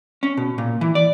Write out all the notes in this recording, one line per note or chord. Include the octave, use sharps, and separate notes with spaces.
C#4
B2
A#2
E3
D5